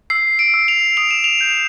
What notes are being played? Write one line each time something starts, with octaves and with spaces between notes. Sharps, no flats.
E6 C7
D7
E6
F7
D#6 F7
E7
F7
G6